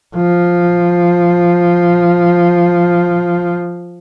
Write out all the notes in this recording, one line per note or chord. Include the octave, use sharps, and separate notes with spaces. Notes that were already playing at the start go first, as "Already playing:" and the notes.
F3